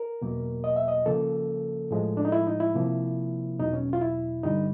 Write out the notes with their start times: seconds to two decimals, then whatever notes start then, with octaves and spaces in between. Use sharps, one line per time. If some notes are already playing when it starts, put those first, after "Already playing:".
Already playing: A#4
0.21 E2 B2 F#3 A#3
0.64 D#5
0.76 E5
0.88 D#5
1.06 C#3 F3 A#3 A4
1.91 A2 F3 G#3
2.17 D4
2.25 D#4
2.32 E4
2.47 D#4
2.60 E4
2.74 C3 F3 A#3
3.59 E2 B2 F#3 D#4
3.73 C#4
3.93 F4
4.01 E4
4.44 G2 D3 G3 D#4